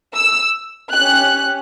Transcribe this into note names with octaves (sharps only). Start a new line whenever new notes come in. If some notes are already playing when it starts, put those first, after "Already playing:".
E6
C#4 G4 F#6